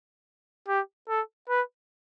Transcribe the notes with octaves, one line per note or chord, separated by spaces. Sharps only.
G4
A4
B4